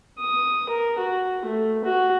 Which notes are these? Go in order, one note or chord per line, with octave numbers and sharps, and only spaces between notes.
D#6
A#4
F#4
A3
F#4